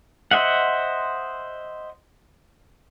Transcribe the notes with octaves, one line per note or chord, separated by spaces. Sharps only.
C5 D#5 E5 F#5